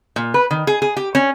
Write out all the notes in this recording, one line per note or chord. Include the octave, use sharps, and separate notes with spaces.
A#2
B4
D#3
G#4
G#4
G4
C#4